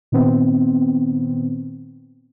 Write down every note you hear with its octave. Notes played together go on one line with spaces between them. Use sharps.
A#2 D#3 B3 C4